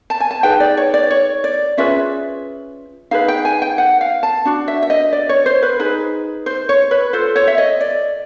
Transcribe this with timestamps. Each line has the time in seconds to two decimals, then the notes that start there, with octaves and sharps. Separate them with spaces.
0.10 A5
0.20 G#5
0.31 A5
0.43 D#4 G#4 B4 G5
0.60 D5
0.77 C#5
0.94 D5
1.11 C#5
1.44 D5
1.77 C#4 F4 G#4 B4 E5
3.11 D#4 G#4 B4 F5
3.28 G5
3.45 G#5
3.62 G5
3.78 F#5
4.01 F5
4.23 A5
4.45 D4 F#4
4.68 E5
4.82 E5
4.90 D#5
5.13 D5
5.29 C#5
5.46 C5
5.63 B4
5.79 D#4 G#4 B4
6.46 C5
6.69 C#5
6.91 B4
7.13 F4 A4 C5
7.36 C#5
7.47 E5
7.58 D#5
7.81 D5